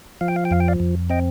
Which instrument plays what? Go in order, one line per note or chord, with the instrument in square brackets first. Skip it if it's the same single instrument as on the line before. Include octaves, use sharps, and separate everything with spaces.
[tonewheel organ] F3 F5
G5
F5
G5
F2 F5
G5
D5 F5
F2
C4 D#5 G5